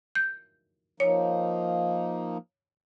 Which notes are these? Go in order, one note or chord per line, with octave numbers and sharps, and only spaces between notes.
G6
F3 A#3 D#4 C#5